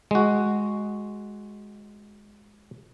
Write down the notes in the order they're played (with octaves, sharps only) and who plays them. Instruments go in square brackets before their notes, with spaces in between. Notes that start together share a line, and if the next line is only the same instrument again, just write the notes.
[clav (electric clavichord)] G#3 F#4